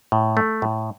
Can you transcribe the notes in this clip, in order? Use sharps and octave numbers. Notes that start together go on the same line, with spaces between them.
A2
A3
A2